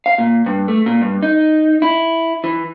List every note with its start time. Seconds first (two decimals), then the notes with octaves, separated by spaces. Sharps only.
0.06 F5
0.18 A#2
0.46 G2
0.68 A3
0.86 A#2
1.01 G2
1.23 D#4
1.82 E4
2.44 E3